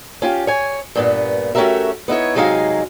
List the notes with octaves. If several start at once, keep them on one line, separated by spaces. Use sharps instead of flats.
C#4 F4 G4
C#5 G#5
G2 A#2 B3
A3 C#4 F#4 G4 A#4 E5
B3 D#4 E4 C#5
C3 F#3 G#3 D#4 F5